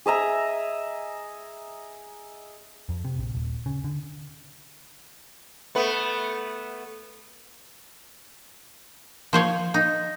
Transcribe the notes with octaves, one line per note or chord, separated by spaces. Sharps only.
G#4 D#5 E5 A#5
F2
C3
A#1
D#1
C#3
D3
A3 B3 B4
F3 C5 C#5
D#4